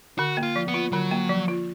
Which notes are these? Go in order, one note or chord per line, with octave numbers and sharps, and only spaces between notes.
D3 F#4
A#3
F4
F3
B3
F4
D3 F#3
A#3
F3
F4